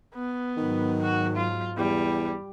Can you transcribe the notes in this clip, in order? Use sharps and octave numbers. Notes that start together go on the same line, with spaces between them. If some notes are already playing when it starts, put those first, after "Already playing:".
B3
G#2 D#3 F#3
F#4
F4
E2 G3